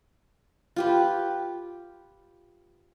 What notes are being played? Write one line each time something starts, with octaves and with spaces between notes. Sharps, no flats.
F4 G4 B4